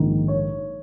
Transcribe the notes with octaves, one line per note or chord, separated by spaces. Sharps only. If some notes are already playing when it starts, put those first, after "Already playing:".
Already playing: A#1 G#2 D#3
C#5